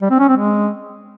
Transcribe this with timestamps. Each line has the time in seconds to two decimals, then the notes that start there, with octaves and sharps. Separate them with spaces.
0.01 G3
0.10 C4
0.19 C#4
0.28 C4
0.37 G#3